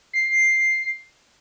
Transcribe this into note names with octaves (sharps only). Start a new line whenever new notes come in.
C7